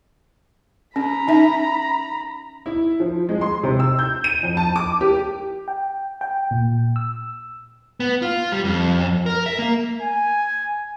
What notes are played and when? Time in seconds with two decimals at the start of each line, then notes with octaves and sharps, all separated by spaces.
0.96 C#4 A#5 B5
1.28 C#4 D#4 E5
2.66 E4
3.00 F3
3.29 G#3
3.41 C6
3.63 C3
3.80 E6
3.99 G6
4.24 D#7
4.43 F2
4.57 A5
4.76 D6
5.01 G4
5.68 G5
6.21 G5
6.51 A#2
6.96 E6
8.00 B3
8.22 F4
8.52 G3
8.64 F2
9.26 A#4
9.46 E5
9.59 A#3
10.01 G#5